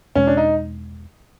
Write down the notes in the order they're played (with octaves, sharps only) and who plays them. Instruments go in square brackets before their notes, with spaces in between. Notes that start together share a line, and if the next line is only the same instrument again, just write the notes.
[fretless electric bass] E2 B2 G#3 [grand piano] C#4
[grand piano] D4
D#4